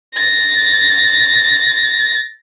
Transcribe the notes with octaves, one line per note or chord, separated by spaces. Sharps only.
A6 A#6